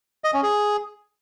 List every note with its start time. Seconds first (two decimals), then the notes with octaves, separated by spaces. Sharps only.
0.24 D#5
0.34 C#4
0.43 G#4